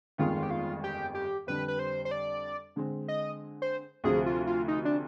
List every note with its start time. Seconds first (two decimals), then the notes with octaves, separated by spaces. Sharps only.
0.18 G1 F2 D#3 G#3 F4
0.43 G4
0.51 F4
0.84 G4
1.15 G4
1.47 F2 D3 G3 D4 B4
1.68 B4
1.79 C5
2.05 C5
2.11 D5
2.76 D3 G#3 C4
3.08 D#5
3.62 C5
4.04 D2 C3 F3 C4 G#4
4.26 F4
4.47 F4
4.68 D#4
4.85 D4